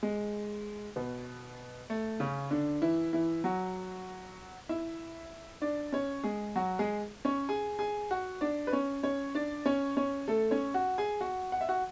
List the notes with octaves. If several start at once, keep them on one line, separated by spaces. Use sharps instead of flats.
G#3
B2 B3
A3
C#3 C#4
D3 D4
E3 E4
E3 E4
F#3 F#4
E4 E5
D4 D5
C#4 C#5
G#3 G#4
F#3 F#4
G#3 G#4
C#4 C#5
G#4 G#5
G#4 G#5
F#4 F#5
D4 D5
B4
C#4 C#5
C#4 C#5
D4 D5
C#4 C#5
C#4 C#5
A3 A4
C#4 C#5
F#4 F#5
G#4 G#5
F#4 F#5
F#5
E5
F#4 F#5